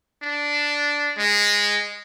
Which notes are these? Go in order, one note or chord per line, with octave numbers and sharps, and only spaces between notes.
D4
G#3